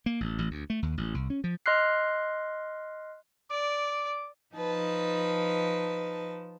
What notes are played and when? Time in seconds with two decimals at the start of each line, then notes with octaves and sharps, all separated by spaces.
0.06 A#3
0.20 A1
0.39 A1
0.51 D2
0.70 A3
0.82 D#2
0.98 A1
1.14 C2
1.30 C#4
1.44 F3
1.66 D#5 C6 F6 F#6 C7
3.51 D5 D6
4.55 F3 D#4 B4 A5